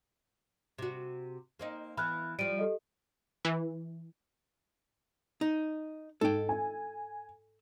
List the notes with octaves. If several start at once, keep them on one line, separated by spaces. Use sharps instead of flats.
C3 F#4
A#3 C4 D#4
E3 B3 B5 F6 F#6
F3 G3 D7 D#7
G4 A4 D#5
E3
D#4
G#2 A4 G5
G#5